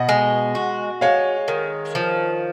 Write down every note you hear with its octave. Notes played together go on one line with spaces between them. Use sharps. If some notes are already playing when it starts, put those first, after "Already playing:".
Already playing: B2 D#5 F#5
G#3
F#4
G#3 C#5 F5
D#3
F3